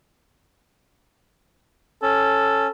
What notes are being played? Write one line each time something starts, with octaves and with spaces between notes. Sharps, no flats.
C#4 A4